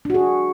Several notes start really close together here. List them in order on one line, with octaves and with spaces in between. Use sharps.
D4 F#4 G#4